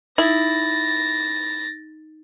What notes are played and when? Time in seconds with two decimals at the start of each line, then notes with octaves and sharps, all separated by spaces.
0.18 D#4 E4 A6 A#6